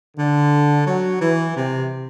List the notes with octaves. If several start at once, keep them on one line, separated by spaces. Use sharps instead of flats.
D3
F#3
E3
C3